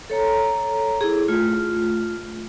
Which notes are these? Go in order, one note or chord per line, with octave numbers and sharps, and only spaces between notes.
A4 C#5 A#5
E4 G#4
A3 F4